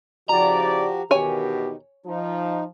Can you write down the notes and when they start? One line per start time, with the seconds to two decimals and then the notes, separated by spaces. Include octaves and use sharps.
0.29 C#3 F3 E4 F#4 G4 D5 A#5
1.11 E2 B2 D#3 G4 C#5 G#5
2.06 F3 D#4